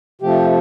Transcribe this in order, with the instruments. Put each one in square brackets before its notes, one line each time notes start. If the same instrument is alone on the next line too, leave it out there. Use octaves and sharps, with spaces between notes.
[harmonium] C3 F3 A3 G4